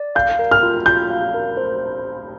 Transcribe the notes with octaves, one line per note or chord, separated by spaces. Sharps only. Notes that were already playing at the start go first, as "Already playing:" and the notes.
Already playing: D5
F5 G6
A#4
F6
F4
F4 G6
F5
A#4
C5